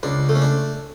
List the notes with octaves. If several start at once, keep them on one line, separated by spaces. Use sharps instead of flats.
C#2 D4
A3
C#4
D4